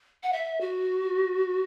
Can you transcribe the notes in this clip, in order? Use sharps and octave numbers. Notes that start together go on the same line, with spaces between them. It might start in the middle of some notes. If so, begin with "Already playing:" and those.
F#5
E5
F#4